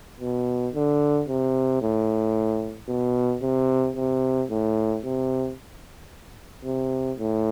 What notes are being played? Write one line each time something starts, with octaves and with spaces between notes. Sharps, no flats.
B2
D3
C3
A2
B2
C3
C3
A2
C3
C3
A2